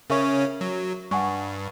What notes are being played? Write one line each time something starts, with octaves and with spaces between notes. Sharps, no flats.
C#3 C#4 A#4 E5 C#6
F#3
G2 F#5 G#5 C#6